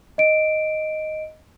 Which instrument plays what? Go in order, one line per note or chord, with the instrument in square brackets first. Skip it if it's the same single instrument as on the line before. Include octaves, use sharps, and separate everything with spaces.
[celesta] D#5 D7